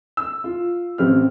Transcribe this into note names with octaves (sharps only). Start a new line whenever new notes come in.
E6
F4
A1 C4 G4 F6